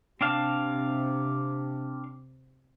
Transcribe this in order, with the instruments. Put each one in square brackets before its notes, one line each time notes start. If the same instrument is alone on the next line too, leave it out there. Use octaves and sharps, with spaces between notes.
[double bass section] C3 [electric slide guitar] C4 D4 F5